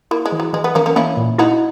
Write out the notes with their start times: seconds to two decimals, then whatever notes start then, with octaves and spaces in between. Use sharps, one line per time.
0.11 A#3 E4
0.26 G#3
0.32 E3
0.40 F#3
0.53 E3 G#3
0.64 B3
0.75 E3 A#3 C#4
0.86 A#3 C#4
0.96 A#3 C#4 E4
1.17 A#2
1.38 D#4 E4 F#4